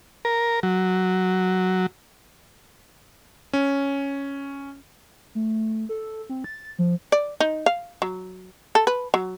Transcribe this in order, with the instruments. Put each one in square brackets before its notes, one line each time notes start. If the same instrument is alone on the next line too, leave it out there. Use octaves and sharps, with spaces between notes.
[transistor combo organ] A#4
F#3
[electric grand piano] C#4
[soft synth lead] A3
A4
C4
A6
F3
[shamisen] D5
D#4
F5
F#3
A4
B4
F#3